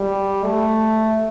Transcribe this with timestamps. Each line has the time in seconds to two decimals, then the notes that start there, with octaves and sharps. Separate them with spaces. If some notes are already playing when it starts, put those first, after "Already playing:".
Already playing: G3
0.44 A3